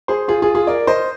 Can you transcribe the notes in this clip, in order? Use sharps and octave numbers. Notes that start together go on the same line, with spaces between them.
G#4 C5
F4 G#4
F4 G#4
F4 G#4
A#4 D5
C5 D#5